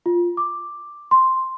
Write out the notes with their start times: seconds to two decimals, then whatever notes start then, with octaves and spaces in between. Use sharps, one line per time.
0.06 F4
0.37 D6
1.11 C6